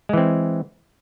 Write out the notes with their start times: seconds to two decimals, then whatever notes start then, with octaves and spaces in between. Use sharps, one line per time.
0.09 G#3
0.13 E3
0.17 C4